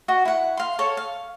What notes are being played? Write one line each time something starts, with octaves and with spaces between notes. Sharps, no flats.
F#4 D#5 F#5
E4 F#5
F5 C6
A4 C#5
F5